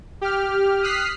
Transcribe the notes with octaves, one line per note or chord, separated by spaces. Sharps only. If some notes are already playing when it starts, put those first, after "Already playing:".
G4 F6
D#6 F6 F#6 B6 C7